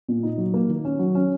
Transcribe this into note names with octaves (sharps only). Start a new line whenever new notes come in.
A#2
D#4
F#3
A#3
D#3
C#4
F#3
C#4